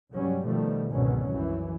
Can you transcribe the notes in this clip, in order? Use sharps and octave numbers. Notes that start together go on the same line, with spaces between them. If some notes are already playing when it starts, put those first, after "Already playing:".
F1 G2 F#3 G3 C#4
B2 D#3 F3 G3 A3
G#1 C#2 B2 D3 F#3 C#4
C2 F#2 E3